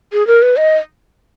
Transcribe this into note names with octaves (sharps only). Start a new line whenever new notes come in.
G#4
A#4
B4
D#5